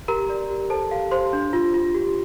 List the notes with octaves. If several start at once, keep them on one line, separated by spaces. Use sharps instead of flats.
G4 A#4 A#5
D5
G4
A4 C5 A5
G4 F5
G4 C5 C6
D4
F4
F4
G4